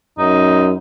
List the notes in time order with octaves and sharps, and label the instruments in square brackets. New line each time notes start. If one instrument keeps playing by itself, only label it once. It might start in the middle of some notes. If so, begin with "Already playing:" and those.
[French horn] F#2 [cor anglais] D#4